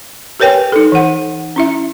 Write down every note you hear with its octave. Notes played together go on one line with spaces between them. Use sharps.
G4 A#4 B4 C#5 G5 G#5
D#4 A4
E3 F#5
C#4 E4 E5